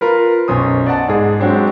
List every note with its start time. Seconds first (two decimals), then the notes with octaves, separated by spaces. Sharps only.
0.01 F4 A#4 B4
0.48 B1 F#2 C5 D#6
0.86 D5 D#5 F#5 A5
1.08 G#2 G#4
1.40 F#3 G#3 C4 D4 G4